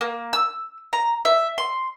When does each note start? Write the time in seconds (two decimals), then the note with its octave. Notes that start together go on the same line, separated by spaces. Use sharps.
0.01 A#3
0.33 E6
0.93 A#5
1.25 E5
1.58 C6